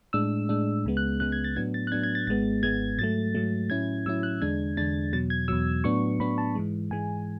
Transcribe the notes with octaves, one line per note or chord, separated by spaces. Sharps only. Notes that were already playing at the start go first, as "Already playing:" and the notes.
A2 G#3 D4 E6
A2 G#3 D4
C#2 C#3 G#3 B3
F#6
C#2 C#3 G#3 B3 F#6
G#6
A6
A2 F#3 B3 D4 G#6
A6
F#6
A2 F#3 B3 D4 G#6
G#6
A6
G#1 G#2 G#3 B3 A6
G#1 G#2 G#3 B3 G#6
G#2 F#3 A3 A6
G#2 F#3 A3
A2 F#3 C#4 E4 G#6
A2 F#3 C#4 E4 E6
F#6
E2 D3 G#3 D4 G#6
E2 D3 G#3 D4 A6
E2 B2 F#3 A6
G#6
E2 B2 F#3 E6
A2 F#3 B3 D4 C#6
A2 F#3 B3 D4 B5
A5
G#2 E3 G#3
G#2 E3 G#3 G#5